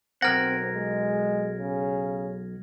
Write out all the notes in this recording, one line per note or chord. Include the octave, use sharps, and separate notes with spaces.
B1 C4 A#4 F#5 F6 G#6 A#6
G#3
C#3